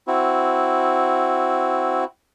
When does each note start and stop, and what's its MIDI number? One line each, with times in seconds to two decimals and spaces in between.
0.07 2.04 60
0.07 2.04 64
0.07 2.04 66